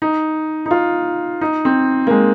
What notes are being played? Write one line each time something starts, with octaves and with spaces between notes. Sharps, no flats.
D#4
D#4
F4
D#4
C4
A#3
G#3